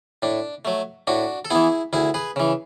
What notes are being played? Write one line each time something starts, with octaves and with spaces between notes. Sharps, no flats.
A2 D4
F#3 A3
A2 D4 F#4
A4
E3 B3 E4 G#4
D2 E4 G#4
G#4 B4
C#3 E3